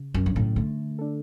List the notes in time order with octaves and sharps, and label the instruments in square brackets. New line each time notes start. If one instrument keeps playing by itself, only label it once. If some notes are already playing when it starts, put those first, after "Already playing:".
Already playing: [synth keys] C#3
[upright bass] F#2 [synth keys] F#3 C#4
[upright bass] G2
A2
[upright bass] D3 [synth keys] A3
[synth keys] D4 A4